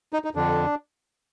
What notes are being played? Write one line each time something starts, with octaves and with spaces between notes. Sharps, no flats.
D#4
D#4
F2 D3 D4